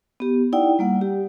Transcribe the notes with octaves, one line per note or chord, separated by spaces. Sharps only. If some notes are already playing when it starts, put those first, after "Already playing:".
B3 G4
D#4 E4 D5 F#5 G5
G3 A#3 F#5
G4